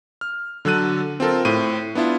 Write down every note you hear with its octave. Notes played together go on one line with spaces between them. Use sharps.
F6
D3 F#3 A4 F#6 D#7
C4 F4 A4 A#4
A2 C4 D#7
B3 D4 E4 F4